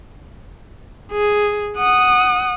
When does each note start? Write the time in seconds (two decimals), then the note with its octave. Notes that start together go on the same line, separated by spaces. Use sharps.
1.12 G#4
1.78 F#5 D#6